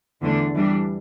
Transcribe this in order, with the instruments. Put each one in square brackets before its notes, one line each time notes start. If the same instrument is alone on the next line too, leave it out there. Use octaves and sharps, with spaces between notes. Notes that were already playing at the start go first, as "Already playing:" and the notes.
[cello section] E2 D3 A3 D4
E3 G3 D4